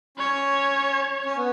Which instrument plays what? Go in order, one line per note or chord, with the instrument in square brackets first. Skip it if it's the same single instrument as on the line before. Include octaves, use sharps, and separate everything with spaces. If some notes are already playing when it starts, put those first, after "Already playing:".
[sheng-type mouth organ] C#4 [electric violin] C#5
[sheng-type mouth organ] C#4
B3